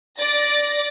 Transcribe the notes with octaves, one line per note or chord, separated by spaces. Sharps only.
D5 A6 A#6